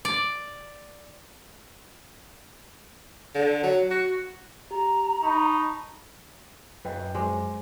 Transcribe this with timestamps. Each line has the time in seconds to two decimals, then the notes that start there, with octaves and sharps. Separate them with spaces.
0.05 D5
3.35 D3
3.63 F#3
3.91 F#4
4.71 G4 A#5
5.23 D#4 A5 B5 C#6
6.85 F#2 B4 D#5 G5
7.15 G#3 C5 D6